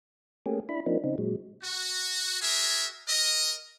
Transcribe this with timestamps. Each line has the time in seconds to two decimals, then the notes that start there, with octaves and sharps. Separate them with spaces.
0.46 A3 A#3 C#4 G4 G#4
0.69 D4 E4 B5
0.86 F3 A#3 C4 D4 D#4
1.04 C#3 C4 D#4
1.18 A#2 F#3 G#3
1.63 F#4
2.42 F#4 G#4 A#4 E5
3.08 A#4 D#5